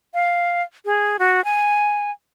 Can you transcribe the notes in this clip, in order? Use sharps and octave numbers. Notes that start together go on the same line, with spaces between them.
F5
G#4
F#4
G#5